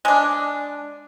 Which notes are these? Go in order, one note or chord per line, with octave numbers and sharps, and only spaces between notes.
G#3 D4